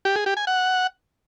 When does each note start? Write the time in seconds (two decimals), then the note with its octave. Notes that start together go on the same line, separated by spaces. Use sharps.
0.05 G4
0.16 G#4
0.26 G4
0.37 G#5
0.47 F#5